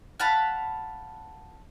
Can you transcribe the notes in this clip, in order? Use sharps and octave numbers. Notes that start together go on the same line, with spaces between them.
F5 F#5 A5 B5